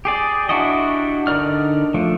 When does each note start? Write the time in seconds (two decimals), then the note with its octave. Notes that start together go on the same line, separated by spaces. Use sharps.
0.05 G4 G#4 D5
0.49 D4 E4 F#4 G4 D#5
1.27 D3 D#4 A#4 D5 F6
1.94 F3 A3 D4